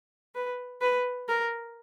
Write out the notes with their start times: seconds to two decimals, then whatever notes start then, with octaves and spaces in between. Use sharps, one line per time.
0.35 B4
0.81 B4
1.29 A#4